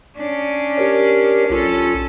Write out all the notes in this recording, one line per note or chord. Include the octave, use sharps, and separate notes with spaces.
C#4 D4
G4 A#4 C#5
B1 C#4 F4 A4